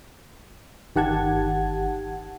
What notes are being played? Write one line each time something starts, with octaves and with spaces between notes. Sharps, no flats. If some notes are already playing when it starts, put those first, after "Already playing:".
G1 D#3 G4 F#5 A5 G#6